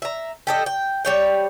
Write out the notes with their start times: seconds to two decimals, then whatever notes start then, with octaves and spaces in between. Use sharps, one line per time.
0.02 E5 A#5
0.47 G4 A4 D#5
0.66 G5
1.05 G3 C#5 G5